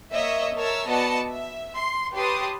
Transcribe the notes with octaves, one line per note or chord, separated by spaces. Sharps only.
A#3 C#5 D#5 E5
A#4 C#5 E5 A5 E6 F6
B3 F#4 D5 D#5 A5 C#7
E5
C6
G4 B4 C#5 A5 C6 D#6